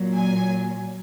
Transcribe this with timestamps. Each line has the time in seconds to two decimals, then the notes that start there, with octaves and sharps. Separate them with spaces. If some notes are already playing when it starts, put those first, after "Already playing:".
Already playing: A#2 F#3
0.15 G#5